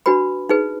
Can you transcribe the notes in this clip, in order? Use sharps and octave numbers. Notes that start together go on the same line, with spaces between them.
D4 F#4 B4 B5
D#4 G#4 B4